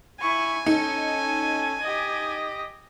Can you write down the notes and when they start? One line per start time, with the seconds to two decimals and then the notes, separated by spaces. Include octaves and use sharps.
0.21 E4 G#5 C#6
0.66 C#4 D#4 A4
1.81 G4 D#5